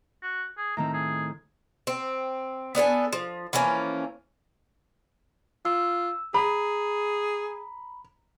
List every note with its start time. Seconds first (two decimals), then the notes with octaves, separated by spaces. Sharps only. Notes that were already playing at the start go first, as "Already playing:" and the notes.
0.23 F#4
0.58 G#4
0.77 A2 D#3 C4 A#5
0.94 G#4
1.87 C4
2.75 B3 D4 A4 G#5
3.13 F3
3.53 E3 F3 A#3 C#4
5.65 F4 E6
6.34 G#4 A#5 B5